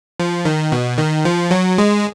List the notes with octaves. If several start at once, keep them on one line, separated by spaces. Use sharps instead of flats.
F3
D#3
B2
D#3
F3
F#3
G#3